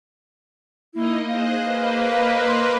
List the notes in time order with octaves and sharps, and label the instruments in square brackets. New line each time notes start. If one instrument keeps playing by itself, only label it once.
[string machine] A#3 D#4 D#5 [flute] E4
[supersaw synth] G#4 F#6 [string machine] C5 D#5 [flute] F5
[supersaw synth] A#3 B4
[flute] C6